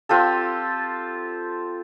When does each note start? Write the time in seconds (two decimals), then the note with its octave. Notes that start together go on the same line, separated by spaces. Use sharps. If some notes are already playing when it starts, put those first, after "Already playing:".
0.09 C4 F4 G4 A4